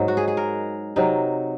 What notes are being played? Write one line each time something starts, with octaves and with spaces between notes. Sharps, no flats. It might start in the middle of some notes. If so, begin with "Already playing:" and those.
Already playing: G#2 F#3 D#4
F#4
G#4
G#4
A#4
C3 F#3 D#4